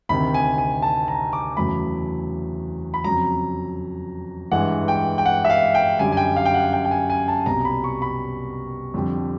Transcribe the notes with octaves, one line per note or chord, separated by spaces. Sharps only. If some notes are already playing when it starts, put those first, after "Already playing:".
D2 C3 D#3 B5
G#5
G#5
A5
A#5
D6
E2 C#3 F#3 A3 B5
B5
F2 C#3 F#3 A#5
G2 E3 G#3 F#5
G5
G5
F#5
E5
F5
G5
F#2 D3 G3 G#5
G#5
G5
F5
G5
F#5
G5
G5
G#5
G#5
A5
C2 B2 G3 A#5
B5
C#6
B5
F2 D3 G3